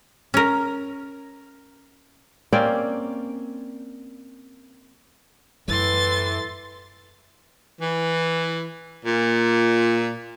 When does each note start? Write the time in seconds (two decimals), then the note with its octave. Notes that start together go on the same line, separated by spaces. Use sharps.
0.34 C#4 A#4
2.52 A#3 C4 C#4 D5
5.68 F#2 A2 E3 C6 A6
7.81 E3
9.06 A#2